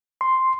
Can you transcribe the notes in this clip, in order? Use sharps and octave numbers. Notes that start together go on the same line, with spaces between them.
C6